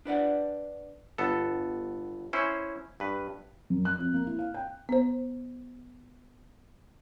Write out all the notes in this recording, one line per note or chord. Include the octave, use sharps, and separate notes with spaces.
D4 B4 D5 F#5
G1 B3 A4
C#4 E4 C5
G2 B4
F#2
F#6
F2
A#3
E4
F5
G5
B3 C5